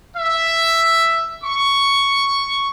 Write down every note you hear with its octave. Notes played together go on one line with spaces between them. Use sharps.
E5
C#6